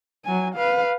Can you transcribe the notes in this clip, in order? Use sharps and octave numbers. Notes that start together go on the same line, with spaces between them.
F#3 G#5
B4 F5